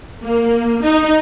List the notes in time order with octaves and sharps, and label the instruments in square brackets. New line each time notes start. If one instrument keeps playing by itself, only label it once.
[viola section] A#3
D#4